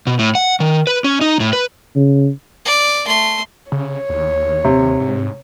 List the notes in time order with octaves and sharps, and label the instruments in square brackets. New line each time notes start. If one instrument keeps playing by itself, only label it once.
[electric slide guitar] B2
A2
F#5
D#3
B4
C#4
D#4
A2
B4
[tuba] C#3
[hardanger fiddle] D5
A3 C6
[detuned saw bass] C#3 [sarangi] C#5
[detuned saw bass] D#2
[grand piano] C3
[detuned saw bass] G#2